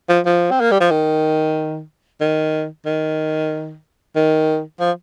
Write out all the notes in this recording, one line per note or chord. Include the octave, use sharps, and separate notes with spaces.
F3
F3
C4
A#3
G3
F3
D#3
D#3
D#3
D#3
F3